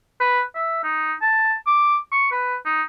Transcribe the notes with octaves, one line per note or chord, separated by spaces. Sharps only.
B4
E5
D#4
A5
D6
C#6
B4
D#4